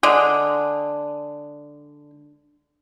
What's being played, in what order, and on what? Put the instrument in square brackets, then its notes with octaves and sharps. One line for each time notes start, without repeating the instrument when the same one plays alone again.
[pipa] D3 G#3